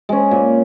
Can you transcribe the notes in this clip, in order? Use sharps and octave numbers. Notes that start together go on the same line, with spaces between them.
G#3 C#4
A#2